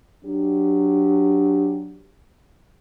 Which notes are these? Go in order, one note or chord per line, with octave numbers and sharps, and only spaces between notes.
F#3 D4 G4